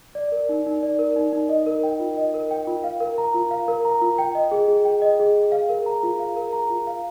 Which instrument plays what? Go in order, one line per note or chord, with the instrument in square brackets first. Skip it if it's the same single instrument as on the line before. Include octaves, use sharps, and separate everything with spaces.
[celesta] D5
A#4
D#4
D#4
D5
A#4
D#4
D#4
D#5
A#4
G5
F4
D#5
A#4
G5
F4
F5
A#4
A#5
F4
F5
A#4
A#5
F4
G5
D#5
G#4
G#4
G5
D#5
G#4
G#4
F5
A#4
A#5
F4
F5
A#4
A#5
F4
F5